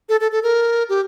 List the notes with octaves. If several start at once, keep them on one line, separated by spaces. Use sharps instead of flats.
A4
A4
A4
A#4
G4